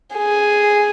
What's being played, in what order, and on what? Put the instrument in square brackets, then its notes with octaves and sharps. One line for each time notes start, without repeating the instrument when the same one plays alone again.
[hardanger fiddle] G#4